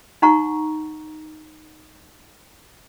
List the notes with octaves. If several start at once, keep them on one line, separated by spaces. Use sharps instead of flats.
D#4 F#5 A#5 C#6